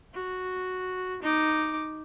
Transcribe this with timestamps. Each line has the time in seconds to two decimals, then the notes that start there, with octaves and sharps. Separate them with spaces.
0.14 F#4
1.23 D#4 D6